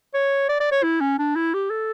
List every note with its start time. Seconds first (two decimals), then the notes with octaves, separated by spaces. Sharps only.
0.14 C#5
0.49 D5
0.60 D5
0.71 C#5
0.83 E4
1.01 C#4
1.18 D4
1.35 E4
1.54 G4
1.70 A4